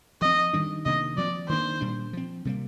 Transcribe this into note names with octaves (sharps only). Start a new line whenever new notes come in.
F3 C4 D#5
D#3 G3 D4
C3 D#3 A#3 D4 D#5
F3 C4 D5
D#3 A#3 D4 C5
A#2 G3 D4
F3 C4
C3 G3 A#3